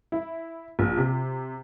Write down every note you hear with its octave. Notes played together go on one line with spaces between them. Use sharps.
E4
A#1
C3